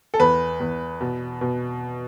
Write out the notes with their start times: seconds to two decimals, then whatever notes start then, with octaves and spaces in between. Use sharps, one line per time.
0.14 A4
0.20 E2 B4
0.60 E2
1.01 B2
1.41 B2